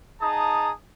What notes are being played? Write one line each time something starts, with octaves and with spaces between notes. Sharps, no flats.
D#4 G#4 A5 A#5 D#6